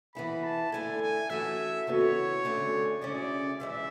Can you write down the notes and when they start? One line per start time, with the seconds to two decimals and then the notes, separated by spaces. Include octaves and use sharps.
0.15 E3 B3 E4 G#4 B5
0.44 A5
0.72 D3 A3 E4 A4 G#5
1.02 G#5
1.30 E3 A3 C#4 F#4 A4 E5
1.87 C#3 E3 B3 F#4 A4 C#5
2.44 D2 D3 A3 C#4 G#4
3.01 D2 C#3 G#3 C#4 E4 D5
3.60 E2 C#3 E3 G#3 E5